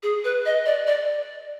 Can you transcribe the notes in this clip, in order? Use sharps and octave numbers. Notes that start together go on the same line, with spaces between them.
G#4
B4
D#5
D5
D5